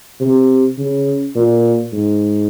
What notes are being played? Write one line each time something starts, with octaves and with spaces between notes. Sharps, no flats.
C3
C#3
A#2
G#2